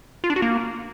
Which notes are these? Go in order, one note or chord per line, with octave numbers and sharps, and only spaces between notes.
F4
D4
F#4
A#3